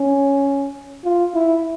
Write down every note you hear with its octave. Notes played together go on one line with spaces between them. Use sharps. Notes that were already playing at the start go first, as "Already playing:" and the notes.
Already playing: C#4
F4
E4